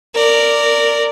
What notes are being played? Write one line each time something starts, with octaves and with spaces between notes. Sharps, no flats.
A#4 D5